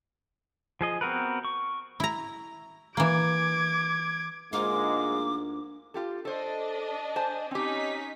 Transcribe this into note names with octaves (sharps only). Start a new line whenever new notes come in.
F3 G#4 D#5
B3 C4 F#4 A#4 B4
C#6
E4 A#5
E3 A#3 D6 G#6
D2 G#2 G#3 A#3 D#4 F4 D6
F4 G4 A4
D4 A4 C5 D#5
C5 G#5 A5
C4 C#4 D#4 G4 B6